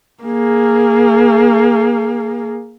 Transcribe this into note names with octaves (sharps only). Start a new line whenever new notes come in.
A#3 G#4